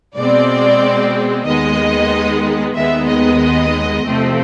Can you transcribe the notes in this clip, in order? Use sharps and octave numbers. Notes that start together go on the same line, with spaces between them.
B2 G#3 C4 D5
D#2 D#3 G#3 B3 D#5
D#2 D#3 G#3 B3 E5
D#5
E2 C3 F3 A3 C4